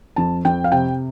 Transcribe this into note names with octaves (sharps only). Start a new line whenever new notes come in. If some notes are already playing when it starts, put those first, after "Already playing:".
F2 A5
F2 G5
F5
C3 G5